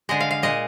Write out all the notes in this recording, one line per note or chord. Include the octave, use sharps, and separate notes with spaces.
D3 G#3 D#5
F5
F5
A#2 G#3 D#5